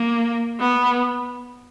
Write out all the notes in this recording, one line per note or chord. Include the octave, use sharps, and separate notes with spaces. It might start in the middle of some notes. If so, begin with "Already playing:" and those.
Already playing: A#3
B3